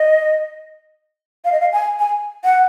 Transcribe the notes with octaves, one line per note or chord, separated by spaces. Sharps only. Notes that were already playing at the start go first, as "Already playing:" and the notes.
Already playing: D#5
F5
D#5
F5
G#5
G#5
F#5